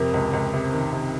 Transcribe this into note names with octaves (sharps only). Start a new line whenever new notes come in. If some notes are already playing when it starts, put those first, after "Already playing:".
Already playing: F2 C3 A#4
C#2
C#2
C3
D#3
C3